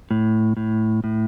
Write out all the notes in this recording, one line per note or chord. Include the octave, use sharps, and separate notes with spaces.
A2
A2
A2